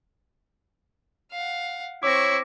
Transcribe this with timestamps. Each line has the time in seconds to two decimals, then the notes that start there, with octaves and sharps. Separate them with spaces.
1.32 F5 F#5
2.03 C4 E4 C#5 C#6 D6 A#6